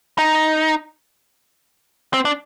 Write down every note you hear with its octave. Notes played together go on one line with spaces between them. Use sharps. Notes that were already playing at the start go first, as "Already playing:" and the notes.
D#4
C4
D4